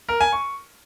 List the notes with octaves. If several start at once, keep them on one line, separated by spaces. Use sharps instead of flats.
A#4
G#5
C#6